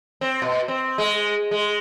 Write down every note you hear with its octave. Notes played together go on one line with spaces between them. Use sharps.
C4
B2
C4
G#3
G#3